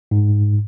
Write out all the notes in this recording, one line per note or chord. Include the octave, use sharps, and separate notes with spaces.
G#2